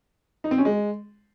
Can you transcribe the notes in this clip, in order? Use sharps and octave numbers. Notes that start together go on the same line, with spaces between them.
D#4
C4
C#4
G#3